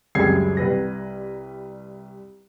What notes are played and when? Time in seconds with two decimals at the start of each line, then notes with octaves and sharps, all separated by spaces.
0.15 C#2 F#2 G3 G#4 G#6 C7
0.57 C2 G3 B4 A#6